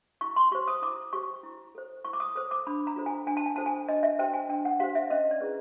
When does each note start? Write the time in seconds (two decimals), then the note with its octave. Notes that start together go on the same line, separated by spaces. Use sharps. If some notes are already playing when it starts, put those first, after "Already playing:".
0.21 E4 C#6
0.36 C6
0.52 G4 C5 C#6
0.68 D#6
0.82 E4 D6
1.13 G4 C5 C#6
1.43 E4
1.75 A4 C5
2.05 E4 C#6
2.13 D6
2.20 D#6
2.35 A4 C5 D#6
2.51 D6
2.67 D4 B5
2.87 A#5
2.96 F4 A4 C5
3.06 G#5
3.27 D4 G#5
3.37 A5
3.46 G#5
3.56 F4 A4 C5 A5
3.66 G#5
3.89 D4 D#5
4.03 E5
4.19 G4 C5 G5
4.33 G#5
4.49 D4 G5
4.65 F#5
4.80 G4 C5 F5
4.95 E5
5.10 C#4 D#5
5.31 D5
5.40 E4 G#4 B4